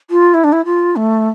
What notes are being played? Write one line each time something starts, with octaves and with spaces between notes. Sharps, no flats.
F4
E4
D4
E4
F4
A3